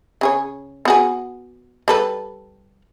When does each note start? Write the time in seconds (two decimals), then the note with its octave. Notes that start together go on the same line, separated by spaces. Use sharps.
0.21 C#3 G#4 C#5
0.85 B3 F#4 G#4
1.88 G3 A4 B4